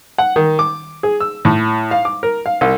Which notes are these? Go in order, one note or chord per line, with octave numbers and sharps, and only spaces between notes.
F#5
D#3
D6
G#4
E6
A2
F5
D6
A#4
F5
C2